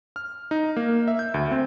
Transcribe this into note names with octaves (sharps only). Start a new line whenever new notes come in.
F6
D#4
A#3
E5
G6
D2
C4